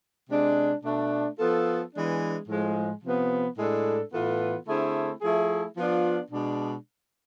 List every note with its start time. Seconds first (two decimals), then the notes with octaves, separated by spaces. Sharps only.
0.30 C3 G#3 D4
0.84 B2 A3 D4
1.39 F3 B3 F4 A4
1.94 E3 G#3 B3 D4
2.48 A2 F3 G#3
3.04 C3 F3 B3
3.58 A2 G#3 D4 A4
4.13 A2 E3 B3 F4 A4
4.68 D3 A3 C4 E4 G#4
5.21 F3 A3 E4 G#4
5.77 F3 B3 D4 F4
6.31 B2 G#3 D4